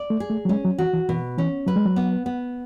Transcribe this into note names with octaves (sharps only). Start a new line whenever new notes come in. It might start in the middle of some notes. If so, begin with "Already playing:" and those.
Already playing: D5
A3
G#4
A3
F#3
G#3 C#4
F#3
E3 F#4
E3
B2 E3
E3 C#4
F#3 B4
G#3
F#3
B3
B3